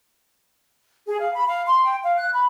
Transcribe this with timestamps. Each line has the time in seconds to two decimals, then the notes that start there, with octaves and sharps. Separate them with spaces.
1.07 G#4
1.20 F5
1.34 B5
1.47 F5
1.67 C6
1.85 G5
2.03 F5
2.17 F#6
2.33 B5